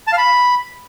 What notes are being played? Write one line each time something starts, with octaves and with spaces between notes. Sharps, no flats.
A5
F5
B5